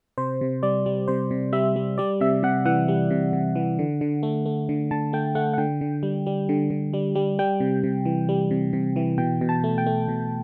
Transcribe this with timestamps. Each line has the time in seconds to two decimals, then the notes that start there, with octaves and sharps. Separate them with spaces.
0.18 C3 C5
0.41 C3
0.63 G3 D5
0.86 G3
1.08 C3 C5
1.31 C3
1.53 G3 E5
1.76 G3
1.98 G3 D5
2.21 C3 E5
2.43 C3 F#5
2.65 E3 F#5
2.88 G3
3.11 C3
3.33 C3
3.56 E3
3.79 D3
4.01 D3
4.23 A3
4.46 A3
4.69 D3
4.91 D3 A5
5.13 A3 G5
5.35 A3 F#5
5.53 F#5
5.58 D3 G5
5.81 D3
6.03 G3
6.26 G3
6.49 D3
6.70 D3
6.93 G3
7.15 G3
7.39 G3 G5
7.60 C3
7.84 C3
8.05 E3
8.29 G3
8.51 C3
8.73 C3
8.96 E3
9.18 B2 G5
9.41 B2
9.49 A5
9.64 A3
9.78 G5
9.86 A3
10.08 B2